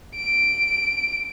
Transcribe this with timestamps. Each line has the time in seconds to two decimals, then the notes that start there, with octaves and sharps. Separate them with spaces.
0.16 D7